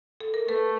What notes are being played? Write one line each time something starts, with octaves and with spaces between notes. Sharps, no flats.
A4
A#4
A3 A4 B4